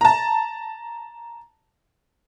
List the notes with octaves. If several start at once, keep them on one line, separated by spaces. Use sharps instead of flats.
A5 A#5